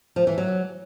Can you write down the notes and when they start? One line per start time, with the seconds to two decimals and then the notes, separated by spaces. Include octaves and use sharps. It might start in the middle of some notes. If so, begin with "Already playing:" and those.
0.16 F3
0.27 E3
0.38 F#3